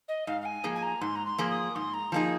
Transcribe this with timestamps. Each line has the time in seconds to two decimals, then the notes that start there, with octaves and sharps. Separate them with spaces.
0.08 D#5
0.27 G#2 F5
0.41 F5
0.45 G#5
0.64 F3 A#3 G#4
0.75 G#5
0.82 A#5
1.01 G#2 C6
1.15 A#5
1.25 C6
1.38 F3 A#3 G#4
1.50 D#6
1.75 G#2 C6
1.94 A#5
2.12 F3 A#3 D#4 G#4